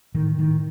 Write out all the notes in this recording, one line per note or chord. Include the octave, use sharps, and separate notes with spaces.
A2 D#3
A2 D#3